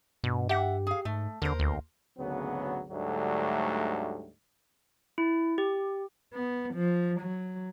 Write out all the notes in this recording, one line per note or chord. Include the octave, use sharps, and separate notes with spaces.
G2 B2
G4 E5 F#5
G#4 F5
G#2 A3
D#2 D3 A#4 C5
D2
G#1 D2 C#3 F#3 B3
D2 G#2 D3 F#3 G3 A3
E4
G4
B3
F3
F#3